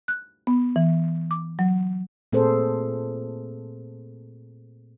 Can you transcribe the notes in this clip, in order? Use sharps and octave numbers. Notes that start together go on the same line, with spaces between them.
F#6
B3
E3
D6
F#3
A#2 A3 C4 G#4 A4 C5